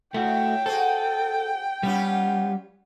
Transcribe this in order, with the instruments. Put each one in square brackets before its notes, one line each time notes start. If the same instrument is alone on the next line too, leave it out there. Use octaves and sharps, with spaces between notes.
[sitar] A2 [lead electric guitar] A3 F#4 [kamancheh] G5
[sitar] F#4 G#4 C5 [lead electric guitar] A4
[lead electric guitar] G3 [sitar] B3 C#4 F4